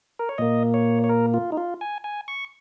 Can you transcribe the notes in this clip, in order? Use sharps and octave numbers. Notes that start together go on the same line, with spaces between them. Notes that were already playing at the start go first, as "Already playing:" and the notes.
A#4
C#5
A#2 A#3 D#5
C#5
C#5
A#4
F4
D#4
F4
G#5
G#5
C#6